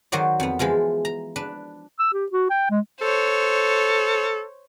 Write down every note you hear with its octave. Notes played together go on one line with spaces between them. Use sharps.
D#3 F#3 F#4 C5 D5
F2 B3
E3 F3 G#3 F4
A#5
D4 B4
E6
G4
F#4
G5
G#3
A4 C5 C#5